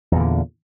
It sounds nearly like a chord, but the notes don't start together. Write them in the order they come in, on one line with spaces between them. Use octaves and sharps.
E2 A#2 D3